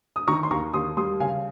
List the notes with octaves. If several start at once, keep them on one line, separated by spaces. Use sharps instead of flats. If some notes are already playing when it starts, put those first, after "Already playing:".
D#6
D#3 A#5 C#6
C6
D#2 A#5 C#6
D#2 C6 D#6
G3 C6 D#6
C#3 F5 G#5